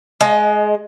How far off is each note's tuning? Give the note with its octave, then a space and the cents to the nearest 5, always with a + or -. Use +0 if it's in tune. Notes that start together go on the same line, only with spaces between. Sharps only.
G#3 +20 D#5 +0